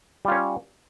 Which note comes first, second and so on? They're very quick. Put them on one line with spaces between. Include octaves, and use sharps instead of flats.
G3 F4 C#4 C#5